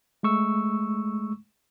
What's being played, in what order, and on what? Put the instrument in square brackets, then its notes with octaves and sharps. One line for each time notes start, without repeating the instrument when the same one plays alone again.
[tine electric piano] G#3 A3 C#6 E6